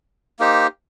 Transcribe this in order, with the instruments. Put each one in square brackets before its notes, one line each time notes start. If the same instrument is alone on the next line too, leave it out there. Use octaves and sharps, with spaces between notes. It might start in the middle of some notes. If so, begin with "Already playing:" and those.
[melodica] A#3 D#4 G4 C5